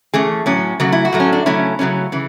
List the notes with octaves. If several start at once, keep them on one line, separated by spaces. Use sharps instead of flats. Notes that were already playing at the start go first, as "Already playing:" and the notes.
E3 A3 C#4 G#4
A2 F#3 C#4
C#3 F#3 A3 F#4
E4
F#4
A2 F#3 A3
C#4
D4
C#3 F#3 A3 C#4 E4
C#3 F#3 A3 C#4
C#3 E3